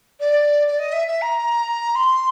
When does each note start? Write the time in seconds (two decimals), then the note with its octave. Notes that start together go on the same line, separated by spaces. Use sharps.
0.20 D5
0.67 D5
0.79 D#5
0.92 E5
1.07 E5
1.21 A#5
1.95 C6